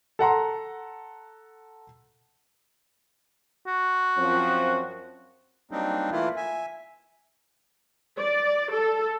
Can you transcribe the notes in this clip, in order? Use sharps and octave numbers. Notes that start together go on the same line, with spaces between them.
A4 F#5 A#5 C6
F#4
F#2 F3 C4
F#3 G3 A#3 C4 D4 D#4
E3 A3 A#3 E4 F4
E5 G#5
D5
A4